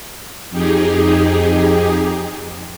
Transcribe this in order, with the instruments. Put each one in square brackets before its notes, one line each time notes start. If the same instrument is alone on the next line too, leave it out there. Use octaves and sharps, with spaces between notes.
[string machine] F2 D#4 G4 G#4